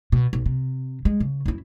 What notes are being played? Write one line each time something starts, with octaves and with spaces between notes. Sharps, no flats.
B2
B1
C3
G#3
C#3
F#2 E4